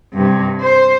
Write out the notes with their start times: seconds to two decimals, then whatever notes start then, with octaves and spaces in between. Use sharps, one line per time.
0.13 G2 C3
0.61 C5